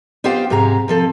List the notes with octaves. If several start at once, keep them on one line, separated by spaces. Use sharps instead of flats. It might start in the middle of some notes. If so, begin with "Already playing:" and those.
B3 F4 G4 C5 F5 G5
G#2 C3 G4 G#4 A#5
C3 F3 A4